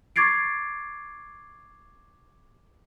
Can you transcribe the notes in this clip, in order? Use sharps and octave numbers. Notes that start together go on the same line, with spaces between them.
C#6 D6 G#6 A6 C7 D7